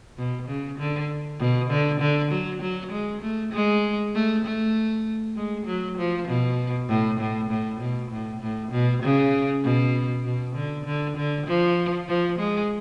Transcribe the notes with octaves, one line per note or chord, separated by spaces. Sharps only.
B2
C#3
D3
B2
D3
D3
F#3
F#3
G#3
A3
G#3
A3
A3
G#3
F#3
F3
B2
A2
A2
A2
B2
A2
A2
B2
C#3
B2
B2
D3
D3
D3
F3
F3
G#3